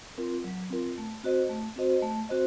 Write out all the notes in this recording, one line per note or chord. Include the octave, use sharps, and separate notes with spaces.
C4 F4 A#4
F#3
C4 F4 A#4
A3
C4 F#4 C5 D#5
A3
C4 F#4 C5 D#5
A3
C4 F#4 C5 D#5